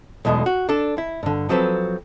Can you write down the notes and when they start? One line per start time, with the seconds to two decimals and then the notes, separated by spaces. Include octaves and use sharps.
0.25 B1 E2 B2 G#3 A3
0.46 F#4
0.69 D4 A4
0.98 E4
1.23 G2 D3
1.49 F3 F#3 C4 A4 B4